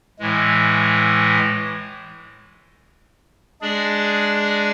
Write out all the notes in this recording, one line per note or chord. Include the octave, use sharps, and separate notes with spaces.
A2 E3 G#3
G#3 D4 G#4 D5